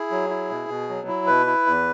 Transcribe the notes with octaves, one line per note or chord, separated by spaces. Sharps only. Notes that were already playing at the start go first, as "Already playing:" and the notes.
Already playing: E4 G#4
F#3
E4
B2
B2
F#3
E4
B2 B4
E4
E2